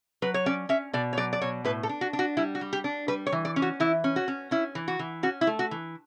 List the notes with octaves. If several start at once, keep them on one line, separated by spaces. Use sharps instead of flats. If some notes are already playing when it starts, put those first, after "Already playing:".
F#3 B4
C#5
C#4 D5
C#4 E5
B2 D5
C#5
F#3 D5
D5
B2 C#5
A2 B4
A4
D4
F#4
D4
F#4
G3 E4
F#4
G3
G4
D4
G3 B4
C#5
E3
D5
C#4
F#4
E3 E4
C#4
F#4
C#4
C#4 E4
E3
F#4
E3
C#4 F#4
E4
A3
F#4
E3